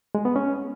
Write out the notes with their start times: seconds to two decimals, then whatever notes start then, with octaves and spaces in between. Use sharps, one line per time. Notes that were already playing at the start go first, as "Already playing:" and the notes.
0.15 G#3
0.25 B3
0.36 C#4